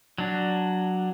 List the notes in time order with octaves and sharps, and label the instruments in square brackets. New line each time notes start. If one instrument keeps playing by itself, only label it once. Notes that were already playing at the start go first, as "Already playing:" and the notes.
[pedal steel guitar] F#3 D4